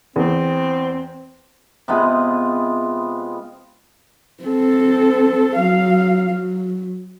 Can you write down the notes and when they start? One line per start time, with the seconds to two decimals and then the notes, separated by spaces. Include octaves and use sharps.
0.16 E2 C4
1.88 C3 G#3 B3 F4
4.43 C4 A4
5.56 F#3 F5
6.30 F#3